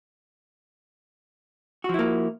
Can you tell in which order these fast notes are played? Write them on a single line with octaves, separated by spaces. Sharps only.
F#4 F3 E4 A#3